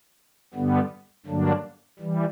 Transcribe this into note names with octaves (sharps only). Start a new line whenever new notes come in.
G2 D3 G3 B3
G2 D3 F#3 A#3 D4
E3 G3